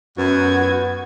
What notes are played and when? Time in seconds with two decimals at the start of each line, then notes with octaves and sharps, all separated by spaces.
0.18 F#2 B3 F#4 G#6